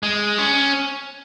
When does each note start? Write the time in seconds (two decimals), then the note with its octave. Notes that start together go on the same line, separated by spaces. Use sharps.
0.03 G#3
0.38 C#4